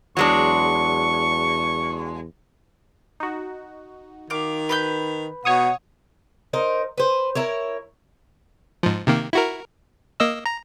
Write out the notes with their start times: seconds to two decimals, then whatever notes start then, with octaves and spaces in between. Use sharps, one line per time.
0.17 E2 F#3 G#3 D4 C#6
3.20 D#4 F#4
4.30 D#3 F5 D6
4.69 B4 B5 G6
5.45 B2 C#5 F#5 C#6 D#6
6.53 D#4 A#4 C5
6.98 B4 C5
7.35 E4 A#4 C#5
8.83 G#2 F3
9.07 C3 D#3 A#3
9.33 E4 F#4 A#4
10.20 A#3 D#5 E6
10.46 A#5